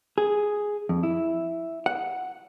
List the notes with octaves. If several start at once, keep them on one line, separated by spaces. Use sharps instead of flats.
G#4
F2
E4
F#5